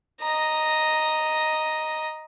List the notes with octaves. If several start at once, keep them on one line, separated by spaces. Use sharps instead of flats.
D#5 A#5